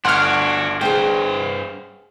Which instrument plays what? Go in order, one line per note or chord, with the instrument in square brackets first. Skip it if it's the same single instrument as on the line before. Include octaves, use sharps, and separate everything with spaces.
[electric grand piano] G1 C6 [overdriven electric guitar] D4 F#4 [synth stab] F#5 F6
[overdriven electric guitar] G2 C5 [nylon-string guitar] G#4 G5